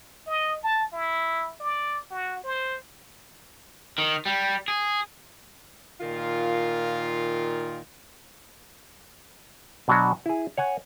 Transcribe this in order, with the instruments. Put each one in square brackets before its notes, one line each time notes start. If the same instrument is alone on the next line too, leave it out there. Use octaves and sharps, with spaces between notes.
[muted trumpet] D#5
A5
E4
D5
F#4
C5
[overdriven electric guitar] D#3
G3
G#4
[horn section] A#2 D#3 F4
[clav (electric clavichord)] B2 F#3 D4 F#4
E4 G#4
C#5 F#5 G#5